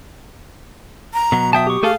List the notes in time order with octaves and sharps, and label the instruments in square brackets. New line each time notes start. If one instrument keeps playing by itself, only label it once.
[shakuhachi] A#5
[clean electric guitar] B2 F#3
[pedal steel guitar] E5 G5 A5 [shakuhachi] D#6
[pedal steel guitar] G4 C#6
[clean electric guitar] A3 G#4 A4 [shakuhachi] F5